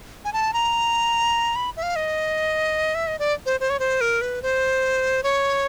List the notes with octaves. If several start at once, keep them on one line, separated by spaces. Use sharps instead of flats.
G#5
A5
A#5
B5
E5
F5
D#5
E5
D#5
D5
C5
C5
C#5
C5
A#4
B4
C5
C#5